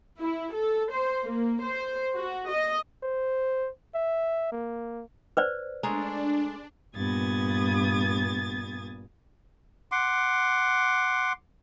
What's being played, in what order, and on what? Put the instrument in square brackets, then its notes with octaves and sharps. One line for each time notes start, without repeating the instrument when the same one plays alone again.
[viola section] E4
A4
C5
A#3
C5
F#4
D#5
[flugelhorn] C5
E5
A#3
[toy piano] B4 C5 D5
[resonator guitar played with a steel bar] G#3 A3 A#5 [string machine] D4
[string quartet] G2 A#2 B3 D#6 G#6 A6
[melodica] F#5 C6 D6